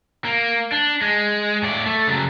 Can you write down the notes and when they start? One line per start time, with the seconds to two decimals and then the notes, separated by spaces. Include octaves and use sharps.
0.25 A#3
0.72 D4
1.02 G#3
1.63 A2 D5
1.86 A3
2.07 C#3 F#3